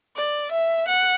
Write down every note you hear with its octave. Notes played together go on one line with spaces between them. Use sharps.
D5
E5
F#5